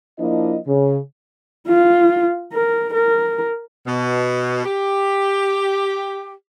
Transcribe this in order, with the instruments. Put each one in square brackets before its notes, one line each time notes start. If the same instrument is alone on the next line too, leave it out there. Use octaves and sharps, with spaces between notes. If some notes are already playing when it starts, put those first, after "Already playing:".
[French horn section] F3 A#3 D4 E4 D#5
C#3
[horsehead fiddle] F4
A#4
A#4
[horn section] B2
G4